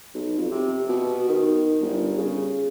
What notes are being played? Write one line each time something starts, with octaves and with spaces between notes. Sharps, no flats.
B1
F2
C3
B2
D#3
G1
C#3